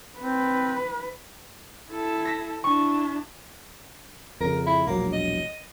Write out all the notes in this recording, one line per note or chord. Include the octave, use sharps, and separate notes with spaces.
C4 B4
E4 A4
A#6 B6
D4 E4 C#6
F2 C#3 A#4
E4
E1 A#1 F#3 A#3
D#5